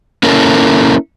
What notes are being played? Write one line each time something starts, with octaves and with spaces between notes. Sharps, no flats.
A#3 C#4 E4 A4 A#4